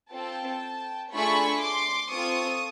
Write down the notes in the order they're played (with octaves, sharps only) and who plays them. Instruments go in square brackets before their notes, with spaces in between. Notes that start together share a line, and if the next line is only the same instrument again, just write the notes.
[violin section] C4 F4 A4 G5 A5
A3 D4 F4 G#4 B5 C#6
C6 D6
C4 F4 A4 C#6 D#6